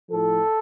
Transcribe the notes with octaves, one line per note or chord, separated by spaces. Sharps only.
A2 F3 A4